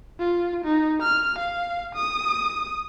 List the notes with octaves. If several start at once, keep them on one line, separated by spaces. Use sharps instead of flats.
F4
D#4
F6
F5
D#6